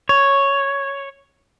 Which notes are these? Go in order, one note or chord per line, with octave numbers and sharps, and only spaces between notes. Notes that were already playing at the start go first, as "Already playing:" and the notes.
C#5